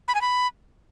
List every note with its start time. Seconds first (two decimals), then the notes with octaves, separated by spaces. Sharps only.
0.08 B5
0.15 G#5
0.21 B5